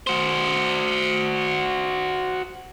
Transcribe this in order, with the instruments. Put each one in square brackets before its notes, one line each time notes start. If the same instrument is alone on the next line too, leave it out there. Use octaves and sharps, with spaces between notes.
[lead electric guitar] F#4 C5